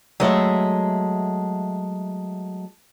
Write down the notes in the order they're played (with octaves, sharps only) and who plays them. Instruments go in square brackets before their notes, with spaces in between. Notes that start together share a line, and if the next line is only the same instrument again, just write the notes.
[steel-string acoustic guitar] F#3 G#3 A3 E5